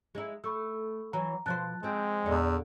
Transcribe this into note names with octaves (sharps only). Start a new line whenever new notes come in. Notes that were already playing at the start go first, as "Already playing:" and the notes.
G#3 D#4 E4
A3 B5 C#6 E6
E3 F#3 A#5
B2 F3 C5 A5 F#6 A6
F3 G#3 C4
E2 A#2 D3 D#4 D5